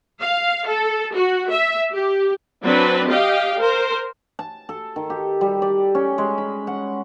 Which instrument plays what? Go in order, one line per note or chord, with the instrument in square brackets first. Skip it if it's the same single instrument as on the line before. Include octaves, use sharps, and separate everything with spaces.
[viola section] F5
A4
F#4
E5
G4
F#3 C4 D4 B4
G4 D#5 F5 G5
A#4 C5
[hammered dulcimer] A5
A4
D#3
G4
G3
D5
C#4
G#3
B5
F#5